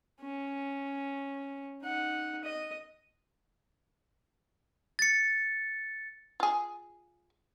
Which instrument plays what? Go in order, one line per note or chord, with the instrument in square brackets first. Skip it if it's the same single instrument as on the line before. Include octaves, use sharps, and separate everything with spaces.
[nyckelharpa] C#4
D#4 F#5
D#5
[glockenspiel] A6 C#7
[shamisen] F4 G#4